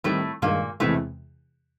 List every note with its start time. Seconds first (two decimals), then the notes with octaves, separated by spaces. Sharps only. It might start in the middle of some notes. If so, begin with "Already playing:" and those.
0.04 A2 D#3 G3 A3 C4
0.42 G2 A#2 D#3 G#3 A#3
0.80 E2 A2 C3 E3 G#3 A3